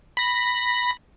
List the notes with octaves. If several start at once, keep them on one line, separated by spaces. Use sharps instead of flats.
B5 A#6